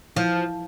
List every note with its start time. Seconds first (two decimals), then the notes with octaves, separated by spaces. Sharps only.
0.16 E3 F3